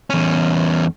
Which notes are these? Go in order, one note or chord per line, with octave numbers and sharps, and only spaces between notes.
E2 C#4